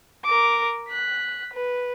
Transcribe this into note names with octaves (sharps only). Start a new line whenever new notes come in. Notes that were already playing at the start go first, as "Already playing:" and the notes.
A#4 D6
F#6 B6
B4